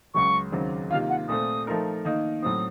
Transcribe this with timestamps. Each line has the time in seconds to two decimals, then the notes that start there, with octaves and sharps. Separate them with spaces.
0.14 C#2 C#3 F#3 C#6
0.52 D#2 C#3 F#3 C4
0.91 C3 D#3 A#3 F4 F5
1.09 F#5
1.28 A#2 A3 C4 D#6
1.67 F3 A3 D#4 A#4
2.05 D#3 A#3 D#4
2.43 A2 F#3 C4 D#6